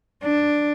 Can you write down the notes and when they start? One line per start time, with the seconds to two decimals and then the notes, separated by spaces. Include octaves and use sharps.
0.23 D4